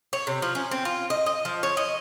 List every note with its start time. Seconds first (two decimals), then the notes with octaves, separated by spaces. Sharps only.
0.13 C#5
0.27 C3
0.42 F3
0.55 C#4
0.71 C4
0.85 F4
1.10 D#5
1.26 D#5
1.45 F3
1.63 C#5
1.77 D#5